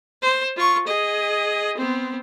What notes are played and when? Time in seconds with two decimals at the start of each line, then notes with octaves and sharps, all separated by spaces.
0.22 C5
0.57 F4 C#6
0.87 G#4 D#5
1.77 B3 C4